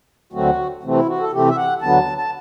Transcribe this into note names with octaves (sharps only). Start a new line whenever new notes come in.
D2 D3 F#3 A3 C4 F#4
C3 E3 A3 C4
E4
F#4
A4
C3 E3 A3 C4 G4
E5
F#5
D2 D3 F#3 B3 A5
A5